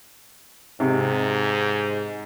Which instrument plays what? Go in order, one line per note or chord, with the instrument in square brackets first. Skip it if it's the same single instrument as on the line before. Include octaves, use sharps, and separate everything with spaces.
[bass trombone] G#2 [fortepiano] C3